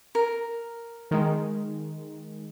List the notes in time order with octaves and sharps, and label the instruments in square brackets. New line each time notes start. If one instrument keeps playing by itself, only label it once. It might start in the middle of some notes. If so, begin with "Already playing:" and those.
[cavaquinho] A#4
[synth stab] D#3 G#3